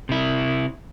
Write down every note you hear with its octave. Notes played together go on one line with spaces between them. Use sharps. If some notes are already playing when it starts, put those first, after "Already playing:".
C3 E4